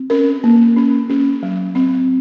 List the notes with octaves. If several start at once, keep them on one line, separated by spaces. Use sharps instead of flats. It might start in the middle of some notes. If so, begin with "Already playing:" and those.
Already playing: C4
C#4 A#4
A#3
C#4
C#4
F#3
C4